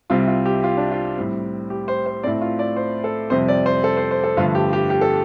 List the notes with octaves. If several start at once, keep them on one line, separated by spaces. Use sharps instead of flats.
C2 C3 G3 C4 F4
F4
G4
F4
D4
F4
A2 G3 C4
G4
C5
C5
A2 A3 C4 D5
F4
D5
C5
A4
F2 C3 G3 C4 C5
D5
C5
A4
C5
C5
A4
G2 D3 F3 A3 F4
G4
G4
G4
A4